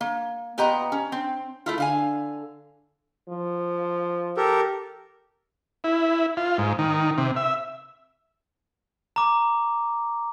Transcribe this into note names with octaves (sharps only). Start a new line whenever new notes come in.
A#3
A#2 B3 G4 D#5 A#5
C#4
C4
A3 E4 F4
D3 F5 G#5
F3
G4 A4 A#4
E4
F4
G#2
D#3
C3
E5
A#5 D6